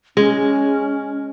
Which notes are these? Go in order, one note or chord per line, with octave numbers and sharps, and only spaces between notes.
G#3 C#4